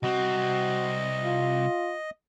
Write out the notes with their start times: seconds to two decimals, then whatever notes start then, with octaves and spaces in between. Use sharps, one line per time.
0.03 C2 C4 F#4 D#5
1.22 F4